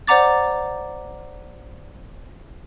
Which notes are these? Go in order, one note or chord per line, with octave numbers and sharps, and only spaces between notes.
C5 D5 F#5 A#5 D6 A6